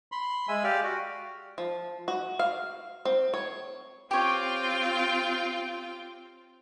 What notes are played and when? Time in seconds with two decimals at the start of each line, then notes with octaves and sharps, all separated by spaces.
0.12 B5 C6
0.48 G#3 E5 G#5
0.64 G4 D5 F5
0.83 F#4
1.58 F3
2.08 F#4
2.39 F5
3.05 C4
3.34 C#5
4.11 C4 F4 G4 C#5 G5